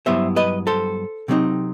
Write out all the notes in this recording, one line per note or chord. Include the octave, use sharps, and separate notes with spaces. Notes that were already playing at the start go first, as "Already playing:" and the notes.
G2 F#3 B3 E4 C5 E5
B4 D#5
A4 C5
C3 F#3 C4 D#4